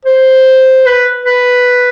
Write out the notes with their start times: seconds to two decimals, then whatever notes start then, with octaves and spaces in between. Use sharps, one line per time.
0.05 C5
0.86 B4
1.25 B4